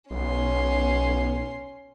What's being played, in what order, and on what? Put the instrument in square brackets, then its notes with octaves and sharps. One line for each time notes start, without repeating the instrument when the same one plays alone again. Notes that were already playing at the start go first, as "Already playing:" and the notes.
[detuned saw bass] B1 [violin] C#4 C6